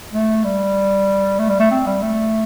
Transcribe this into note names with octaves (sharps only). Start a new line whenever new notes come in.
A3
G3
A3
G3
A3
C4
G3
A3